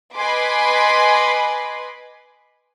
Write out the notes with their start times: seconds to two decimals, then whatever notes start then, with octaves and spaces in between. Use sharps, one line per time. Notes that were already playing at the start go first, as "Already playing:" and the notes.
0.15 B4 D#5 G#5 B5 C6 D6